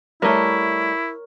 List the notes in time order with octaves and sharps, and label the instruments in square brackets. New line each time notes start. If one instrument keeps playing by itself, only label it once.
[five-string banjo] G3 A3 [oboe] E4 [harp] A#4 C#5